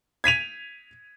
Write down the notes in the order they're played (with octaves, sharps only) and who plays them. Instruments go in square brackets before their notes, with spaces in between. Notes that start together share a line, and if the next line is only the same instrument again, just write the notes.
[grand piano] G#6 B6 D#7 F7